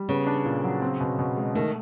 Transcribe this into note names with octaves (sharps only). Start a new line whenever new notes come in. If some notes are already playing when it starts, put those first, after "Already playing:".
Already playing: G3
C#3 B3
D4
A#2
F#3
C4
B2
B2
G#3
D#3 A3